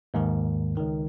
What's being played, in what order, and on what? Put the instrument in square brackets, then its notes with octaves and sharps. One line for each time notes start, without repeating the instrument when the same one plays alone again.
[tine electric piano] D#2 G#2 D#3
C#2 D#3